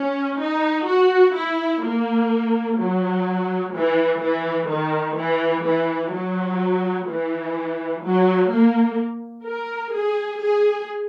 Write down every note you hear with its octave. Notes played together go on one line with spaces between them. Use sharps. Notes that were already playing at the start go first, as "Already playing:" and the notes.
Already playing: C#4
D#4
F#4
E4
A#3
F#3
E3
E3
D#3
E3
E3
F#3
E3
F#3
A#3
A#4
G#4
G#4